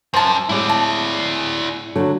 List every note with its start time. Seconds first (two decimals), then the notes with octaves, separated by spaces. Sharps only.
0.14 F#2 C5 A5
0.49 A2 G#3 E4 D5
0.69 A5
1.96 D3 F#3 A3